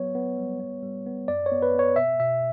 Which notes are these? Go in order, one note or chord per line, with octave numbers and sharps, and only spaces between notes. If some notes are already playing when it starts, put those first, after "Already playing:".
Already playing: F#3 B3 C#5
B3
G3
B3
G3
B3
F#2 D5
C#5
B3
B4
B3 C#5
B2 E5
B2 E5